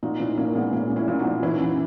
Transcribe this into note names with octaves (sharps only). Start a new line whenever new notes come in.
A#2 D#4 F#4
A#2 C#4 E4
A#2 A#3 C#4
A#2 G#3 B3
A#2 A#3 C#4
A#2
C#4 E4
A#2
D#4 F#4
A#2
E3 C#4 E4
F#2